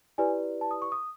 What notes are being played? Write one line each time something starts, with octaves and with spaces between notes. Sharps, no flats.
E4 G4 B4 D5 G#5
A5
D#6
C#6
D#6